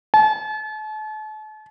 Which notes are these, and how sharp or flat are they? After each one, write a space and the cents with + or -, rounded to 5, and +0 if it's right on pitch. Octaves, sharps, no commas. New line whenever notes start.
A5 -40